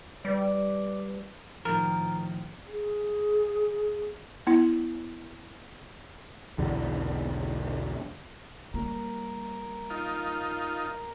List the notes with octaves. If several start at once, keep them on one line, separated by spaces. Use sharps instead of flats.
G3 B4 D5
A2 D#3 F3 A#4
G#4
B3 E4
B1 E2 D3
G3 A#3 A#4
D#4 F4